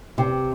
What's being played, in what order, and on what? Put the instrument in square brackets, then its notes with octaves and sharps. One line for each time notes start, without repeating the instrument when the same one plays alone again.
[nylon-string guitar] C3